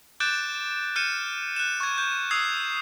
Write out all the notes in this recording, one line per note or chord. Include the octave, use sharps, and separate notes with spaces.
D6 F#6 G6 A6 D7 E7
F6 G6 C#7 D#7 E7
F#6 E7
C#6 G#6
G6
D#6 E6 G#6 C7